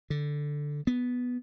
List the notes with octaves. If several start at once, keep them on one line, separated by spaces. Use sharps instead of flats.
D3
B3